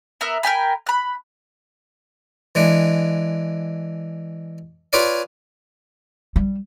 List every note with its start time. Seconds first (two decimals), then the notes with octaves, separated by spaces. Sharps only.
0.21 B3 A#4 E5
0.43 A#4 G5 G#5 B5
0.87 B5 F#6
2.55 E3 G#3 D4
4.93 F4 G#4 B4 C#5 D5 F5
6.36 G3